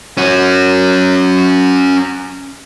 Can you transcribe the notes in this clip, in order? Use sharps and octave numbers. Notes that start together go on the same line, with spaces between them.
C#4 F#4